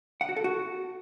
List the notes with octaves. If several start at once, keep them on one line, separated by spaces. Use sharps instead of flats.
F#5
F#4
A4
F#4